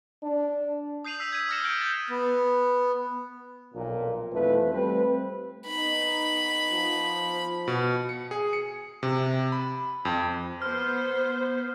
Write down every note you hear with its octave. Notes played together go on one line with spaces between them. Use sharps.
D4
D#6 G6 C7 D#7 F7 F#7
E6 B6
G#6 B6 D#7
D#6 F6 A#6 C#7 E7
D#6 E6 G6 D7
G6 A6
B3
B1 F2 A#2
B1 F2 E3 F3 A3 B4
G3 A3 C4 B4
B3 D#4 B5
F3
B2
C#7
G#4
C#7
C3
B5
F2
B3 C5 F6